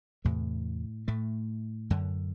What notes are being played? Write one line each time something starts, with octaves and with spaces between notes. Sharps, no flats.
E2 A2 C3 A3
A2 A3
F#2 D3